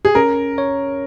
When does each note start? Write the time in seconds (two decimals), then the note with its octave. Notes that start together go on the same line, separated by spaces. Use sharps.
0.05 G#4
0.15 C#4 A#4
0.58 C#5